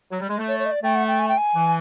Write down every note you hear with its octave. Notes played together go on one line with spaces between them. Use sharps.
F#3
G3
G#3
A3
C#5
C#5
D#5
D5
A3 G5
F#5
G5
G#5
G5
G#5
E3